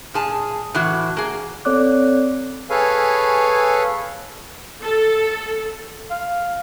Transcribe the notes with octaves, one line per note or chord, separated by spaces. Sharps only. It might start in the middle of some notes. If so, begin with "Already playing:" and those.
A#2 G#4 A5
A2 E3 F#4
A#3 G#4
C4 A4 C#5 D5 D6 F#6
G#4 A4 B4 C#5 F5 G#5
A4
F5